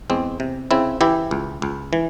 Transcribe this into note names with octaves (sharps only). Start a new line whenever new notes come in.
E2 G#3 C4
C3
C#3 C4 E4
E3 E4 G4
C#2
C#2
E3